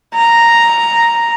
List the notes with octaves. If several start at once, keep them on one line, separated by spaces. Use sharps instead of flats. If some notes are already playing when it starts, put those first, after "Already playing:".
A#5